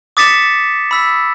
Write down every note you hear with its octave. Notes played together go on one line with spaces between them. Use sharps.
D6 D#6 A6 B6 C#7 E7
B5 E6 B6